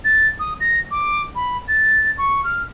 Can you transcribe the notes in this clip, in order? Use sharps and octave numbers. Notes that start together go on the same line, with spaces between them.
A6
D#6
A#6
D6
B5
A6
C#6
F6